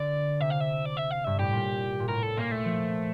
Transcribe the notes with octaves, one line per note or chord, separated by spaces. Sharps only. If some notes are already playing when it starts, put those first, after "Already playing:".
Already playing: D3 D5
C3 E5
F5
E5
D5
E5
F5
G2 E5
A2 G4
A#2
A#2
A2 A#4
A4
A#2 A#3
A3
F3